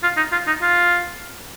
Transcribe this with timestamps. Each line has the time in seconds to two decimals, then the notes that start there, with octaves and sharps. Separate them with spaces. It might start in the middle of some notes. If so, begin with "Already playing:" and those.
0.03 F4
0.17 D#4
0.32 F4
0.47 D#4
0.62 F4